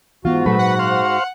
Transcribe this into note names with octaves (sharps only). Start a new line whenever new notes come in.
G#2 E3 B3 F4 F#4
A#2 F#3 A3 B4
F#5
C5 F5